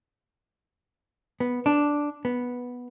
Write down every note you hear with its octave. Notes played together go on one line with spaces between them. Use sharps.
B3
D4
B3